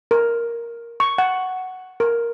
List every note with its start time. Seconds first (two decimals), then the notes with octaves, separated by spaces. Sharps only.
0.11 A#4
1.00 C#6
1.18 F#5
2.00 A#4